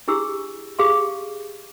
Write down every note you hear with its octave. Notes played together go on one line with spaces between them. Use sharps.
D4 E4 G4 G#4 E6
G4 G#4 F5 C6